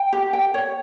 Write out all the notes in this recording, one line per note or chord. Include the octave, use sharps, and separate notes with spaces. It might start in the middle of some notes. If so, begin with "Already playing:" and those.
Already playing: G5
G4
G5
C#5